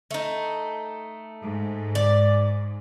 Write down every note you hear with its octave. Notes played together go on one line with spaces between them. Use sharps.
A3 D#4
G#2
D5